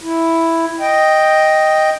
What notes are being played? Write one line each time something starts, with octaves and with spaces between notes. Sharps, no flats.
E4
D#5 G5